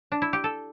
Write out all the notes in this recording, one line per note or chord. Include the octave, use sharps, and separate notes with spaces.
D4
E4
G4
A4